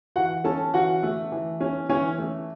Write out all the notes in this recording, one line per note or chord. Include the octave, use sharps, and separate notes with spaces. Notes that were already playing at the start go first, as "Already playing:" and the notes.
E3 F#4 F#5
C#4 A4 A5
E3 F#4 F#5
A3
E3
C#4
E3 C#4 C#5
A3